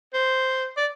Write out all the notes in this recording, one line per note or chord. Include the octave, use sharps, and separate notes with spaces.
C5
D5